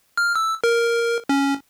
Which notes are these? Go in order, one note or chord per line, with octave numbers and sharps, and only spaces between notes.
F6
E6
A#4
C#4